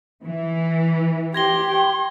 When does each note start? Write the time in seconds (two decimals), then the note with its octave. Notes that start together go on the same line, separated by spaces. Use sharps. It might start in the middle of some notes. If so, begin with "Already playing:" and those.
0.24 E3
1.34 G4 C6 G#6 A#6 G7